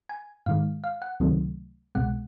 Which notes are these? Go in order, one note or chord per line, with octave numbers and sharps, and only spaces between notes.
G#5
G#2 D#3 G#3 F5
F5
F#5
C#2 C3 D#3 F#3 A3
C2 B2 G#3 F#5